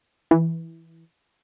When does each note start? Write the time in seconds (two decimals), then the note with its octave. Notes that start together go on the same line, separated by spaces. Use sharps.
0.31 E3